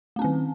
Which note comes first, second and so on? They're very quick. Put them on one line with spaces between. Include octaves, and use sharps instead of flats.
A3 C#4 C4 D#3